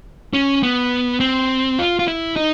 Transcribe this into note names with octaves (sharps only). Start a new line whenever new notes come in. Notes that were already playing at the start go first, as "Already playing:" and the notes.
C#4
B3
C4
F4
F4
E4
D#4